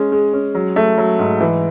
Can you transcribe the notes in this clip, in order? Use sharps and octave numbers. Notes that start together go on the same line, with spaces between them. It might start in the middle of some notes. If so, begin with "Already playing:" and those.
Already playing: G#3 C#4
G#3
C#4
F#3
A3
F#3
G#2
E3